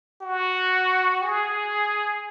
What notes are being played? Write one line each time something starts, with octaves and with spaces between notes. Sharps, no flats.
F#4
G#4